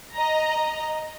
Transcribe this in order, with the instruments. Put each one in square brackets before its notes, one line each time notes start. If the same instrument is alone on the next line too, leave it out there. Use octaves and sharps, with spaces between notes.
[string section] D#5 A#5